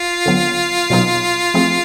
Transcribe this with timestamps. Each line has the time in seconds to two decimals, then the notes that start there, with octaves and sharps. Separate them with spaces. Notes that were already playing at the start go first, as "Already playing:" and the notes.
Already playing: F4
0.26 D3 F#3 B3
0.90 B2 F#3 B3 D#4 G#4
1.54 F3 A3 C4 E4 G#4